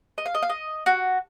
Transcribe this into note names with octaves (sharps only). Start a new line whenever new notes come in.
D#5
F5
D#5
F5
D#5
F#4